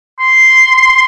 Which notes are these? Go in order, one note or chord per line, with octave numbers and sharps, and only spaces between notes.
C6